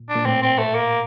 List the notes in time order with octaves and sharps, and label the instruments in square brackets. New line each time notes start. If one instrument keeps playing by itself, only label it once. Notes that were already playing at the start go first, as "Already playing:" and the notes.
Already playing: [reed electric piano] A#2
[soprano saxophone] D4
[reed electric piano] A#2
[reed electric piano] A2 [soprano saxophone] C4
[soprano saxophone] C4
A3
A#3